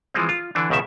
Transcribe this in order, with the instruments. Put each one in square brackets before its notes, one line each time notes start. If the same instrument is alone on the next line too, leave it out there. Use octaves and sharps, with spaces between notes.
[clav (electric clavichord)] E3 F3 G#3 C4
F4
D3 E3 D4
C#2 B2 D#3 E5